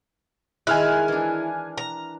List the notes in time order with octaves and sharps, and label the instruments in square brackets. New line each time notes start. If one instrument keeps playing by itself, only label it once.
[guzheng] D#3 G#3 [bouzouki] E4 [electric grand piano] G#5 F6 F#6
[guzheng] E3 D4
[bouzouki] A#5